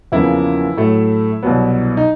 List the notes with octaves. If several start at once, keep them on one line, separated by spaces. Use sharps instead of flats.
E2 C#3 F3 A#3 E4
A2 F#3 A3
C2 B2 F#3 B3
D#4